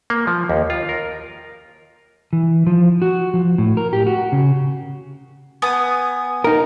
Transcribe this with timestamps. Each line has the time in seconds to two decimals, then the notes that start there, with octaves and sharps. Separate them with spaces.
0.10 A#3
0.27 F3
0.49 D#2
0.70 F4
0.89 A#4
2.33 E3
2.67 F3
3.02 F#4
3.34 F3
3.58 A2
3.77 A#4
3.93 G4
4.07 F#4
4.32 C#3
5.62 B3 G#5 D#6
6.44 D#4 A#4